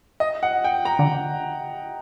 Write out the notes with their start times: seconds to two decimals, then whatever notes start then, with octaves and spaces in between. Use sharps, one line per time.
0.20 D#5
0.43 F#5
0.64 G5
0.85 A#5
0.99 D3